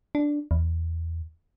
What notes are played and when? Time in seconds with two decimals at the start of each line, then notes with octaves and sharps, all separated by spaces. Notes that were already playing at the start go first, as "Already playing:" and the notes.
0.15 D4
0.51 E2